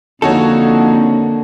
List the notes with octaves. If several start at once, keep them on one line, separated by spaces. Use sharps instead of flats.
F2 D3 A#3 D#4 F#4 A4 C#5